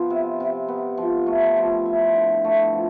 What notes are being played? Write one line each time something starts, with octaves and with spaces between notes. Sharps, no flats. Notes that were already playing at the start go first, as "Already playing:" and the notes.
Already playing: F3 B3
C3
C3
B3
F3
A3
F3
E4
D3
A3
F3